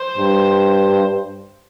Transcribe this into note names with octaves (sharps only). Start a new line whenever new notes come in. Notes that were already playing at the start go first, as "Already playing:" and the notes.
Already playing: C5
G2